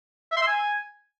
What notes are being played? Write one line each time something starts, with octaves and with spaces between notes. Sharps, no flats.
E5
C6
E6
G#5